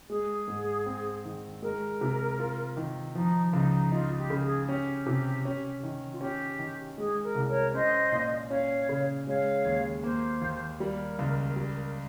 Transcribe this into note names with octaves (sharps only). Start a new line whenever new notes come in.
G#3 G#4
G#2
C4
D#3
G#3 A#4
C3
F4
D#3
F3 D#4
C#2 D#4
D#4 F4
G4
C#3
G#4
C#4 G4
C3
C#4
D#3
F4
C#4 G4
D#3
G#3 G#4
A#4
C2
A#4 C#5
C#4 C5 D#5
A#2
C#4 C#5 F5
C#3
G#3 C#5 F5
D#2
A#3 C5
D#2
G3 A#4
C#2
G3